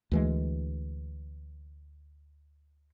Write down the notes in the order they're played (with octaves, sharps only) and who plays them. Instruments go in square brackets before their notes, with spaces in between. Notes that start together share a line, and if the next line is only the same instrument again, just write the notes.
[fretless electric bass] D2 E3 G#3